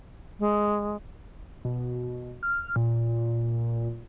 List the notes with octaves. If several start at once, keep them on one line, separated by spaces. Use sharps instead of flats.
G#3
B2
F6
A#2